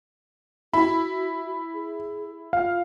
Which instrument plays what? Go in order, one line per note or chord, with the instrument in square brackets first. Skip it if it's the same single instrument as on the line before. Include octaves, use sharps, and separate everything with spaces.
[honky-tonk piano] E4 [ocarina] F#4 [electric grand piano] B5
[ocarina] G#4
[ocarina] F4 [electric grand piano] F5